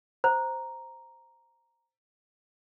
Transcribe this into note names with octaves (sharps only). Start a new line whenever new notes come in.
C5 A#5